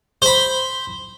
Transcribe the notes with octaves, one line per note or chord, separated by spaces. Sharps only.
C5 B5